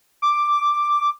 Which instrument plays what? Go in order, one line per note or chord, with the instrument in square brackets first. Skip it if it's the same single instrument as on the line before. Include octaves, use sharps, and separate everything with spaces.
[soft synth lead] D6